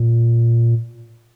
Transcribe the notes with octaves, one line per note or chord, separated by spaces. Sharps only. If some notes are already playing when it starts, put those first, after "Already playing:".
Already playing: A#2